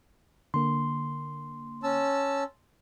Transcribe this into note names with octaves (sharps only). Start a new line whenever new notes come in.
D3 A#3 C6
C#4 A5 E6